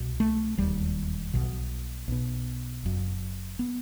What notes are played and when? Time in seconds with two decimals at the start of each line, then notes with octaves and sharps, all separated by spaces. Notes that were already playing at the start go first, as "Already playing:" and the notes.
Already playing: C2 B2
0.20 A3
0.57 E1 D#2 G3
1.34 B1 B2
2.08 B1 B2
2.83 F#1 F#2
3.59 B3